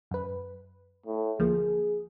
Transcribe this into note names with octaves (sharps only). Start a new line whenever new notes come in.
F#2 B4
A2
D2 F3 A#3 G#4